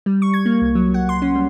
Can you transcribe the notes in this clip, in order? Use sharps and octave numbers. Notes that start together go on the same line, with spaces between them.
G3
C#6
G#6
A#3
C2
F#3
F#5
C6
C#4
G3